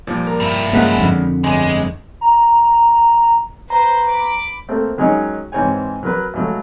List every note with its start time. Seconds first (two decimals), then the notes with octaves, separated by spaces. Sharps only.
0.07 A#2 F3 G3 D5
0.27 A#4
0.40 G2 E4
0.73 C#3 F3 G#3 A#3 F#5 F#6 B6
0.96 F2 D3
1.44 G1 G#3 D#7
2.21 A#5
3.70 B4 C5 A#5
4.09 B5 D6
4.69 A3 A#3 C4 A4
4.98 D#3 F#3 G#3 C#4 D#4 C#5
5.52 G#2 E3 C4 C5 C#5 G#5
6.03 F#3 A#4 B4
6.34 C#2 F#3 A3